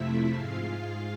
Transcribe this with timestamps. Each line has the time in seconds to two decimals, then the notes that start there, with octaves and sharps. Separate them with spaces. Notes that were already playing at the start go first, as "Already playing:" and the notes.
Already playing: F2 C3 F3 A3 E4 E5
0.31 G#2 G#3 F4 F5